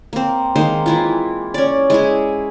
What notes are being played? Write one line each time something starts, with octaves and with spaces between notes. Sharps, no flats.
A#3 C4
D#3 G#3 A#3 C5
E3 E4 F4
C#4 D5
G#3 E4 G#4